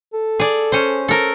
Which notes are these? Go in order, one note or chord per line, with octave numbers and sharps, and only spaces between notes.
A4
G#4 D5
C#4 C5
A4 A#4